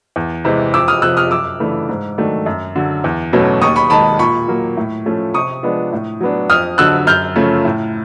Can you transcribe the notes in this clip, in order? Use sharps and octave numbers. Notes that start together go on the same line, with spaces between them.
E2
C3 E3 G#3
F2 D6 E6
D#6 F6
C3 F3 E6 F#6
D#6 F6
F#2 D6 E6
C#3 E3 A3 D4
G#2
D#3 F#3 A3 D4
F#2
D3 F#3
E2
B2 F#3 A3 C#4
D#2 C#6 D#6
B5 C#6
D#3 G#3 A5 B5
A#2 B5 C#6
F#3 A#3
A2
F3 A3 C#4
C3 C#6 D#6
F3 G#3 B3 D4
A2
F#3 B3 D4
F2 D#6 F6
D3 F#3 E6 F#6
F#2 F6 G6
C#3 F3 A3 C#4
A2